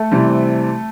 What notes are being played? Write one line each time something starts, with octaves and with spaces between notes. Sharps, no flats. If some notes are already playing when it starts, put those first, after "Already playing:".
Already playing: A3 A4
C3 E3 G3 C4